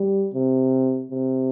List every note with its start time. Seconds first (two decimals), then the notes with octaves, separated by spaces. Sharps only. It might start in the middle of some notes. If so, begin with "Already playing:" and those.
Already playing: G3
0.34 C3
1.11 C3